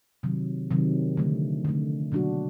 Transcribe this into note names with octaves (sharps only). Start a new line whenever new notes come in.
C3 D#3 F#3
C3 D#3 F#3
D3 F3 A3
D3 F3 A3
B2 F#3 A#3 D4 F#4